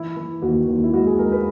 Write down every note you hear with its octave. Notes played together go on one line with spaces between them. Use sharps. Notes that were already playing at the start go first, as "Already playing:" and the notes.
Already playing: E3 E4
E3
D#2 F#4
D#2
E4
G#3 F#4
G#4
G#3 A#4
B4